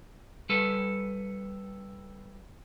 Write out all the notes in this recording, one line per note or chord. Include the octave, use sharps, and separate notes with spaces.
G3 A4 B4